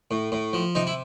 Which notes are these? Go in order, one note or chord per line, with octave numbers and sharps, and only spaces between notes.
A2
A2
F3
C3 D#4
E4